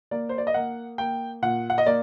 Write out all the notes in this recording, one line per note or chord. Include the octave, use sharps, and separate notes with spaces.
A#3 D5
C5
D5
D#5
A#3 F#5
A#3 G5
A#2 F#5
F#5
D#5
A#3 D5